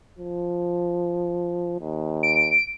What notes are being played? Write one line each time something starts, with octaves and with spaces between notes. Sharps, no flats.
F3
D#2
D7